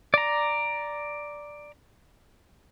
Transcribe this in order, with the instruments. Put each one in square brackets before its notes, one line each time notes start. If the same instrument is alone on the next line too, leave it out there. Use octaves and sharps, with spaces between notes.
[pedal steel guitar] D5 A#5